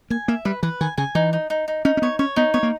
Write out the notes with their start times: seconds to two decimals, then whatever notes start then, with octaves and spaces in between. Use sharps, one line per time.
0.10 A#3 G#5
0.28 A#3 E5
0.45 G3 B4
0.63 E3 B4
0.81 D#3 G#5
0.97 C#3 G#5
1.15 E3 D#4
1.33 D#4
1.50 D#4
1.68 D#4
1.85 C#4 D#4
1.97 C#4
2.02 B3 C#5
2.19 C#4 C#5
2.36 B3 D#4
2.54 B3 C#5
2.63 A#3